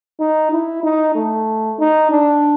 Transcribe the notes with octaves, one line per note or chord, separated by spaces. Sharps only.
D#4
E4
D#4
A3
D#4
D4